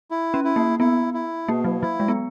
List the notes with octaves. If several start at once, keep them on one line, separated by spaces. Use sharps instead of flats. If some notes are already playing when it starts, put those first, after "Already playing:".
E4
C#4
E4
A#3
B3 E4
E4
B2 A#3
F#3
F#3 E4
G#3
B3